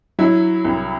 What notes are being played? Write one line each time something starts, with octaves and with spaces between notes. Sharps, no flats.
F#3 E4
C2